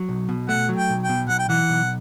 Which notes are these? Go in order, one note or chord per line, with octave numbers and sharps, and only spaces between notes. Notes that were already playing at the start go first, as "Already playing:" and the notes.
Already playing: F#3
B1
B2
A3 F#5
F#3
G5
B1
G5
B2
B1 F#5
G5
E3 F#5
B1